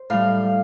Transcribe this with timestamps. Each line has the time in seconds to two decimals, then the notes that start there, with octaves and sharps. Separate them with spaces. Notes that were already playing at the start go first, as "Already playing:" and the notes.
Already playing: C5
0.10 A2 G3 F5